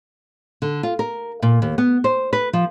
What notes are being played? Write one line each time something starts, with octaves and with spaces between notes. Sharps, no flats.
D3
F4
A#4
A#2
D#2
B3
C5
B4
F3